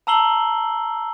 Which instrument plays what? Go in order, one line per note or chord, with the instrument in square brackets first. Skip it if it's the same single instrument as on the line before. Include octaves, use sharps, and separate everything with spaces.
[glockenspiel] A5 A#5 E6 C7 F#7 G7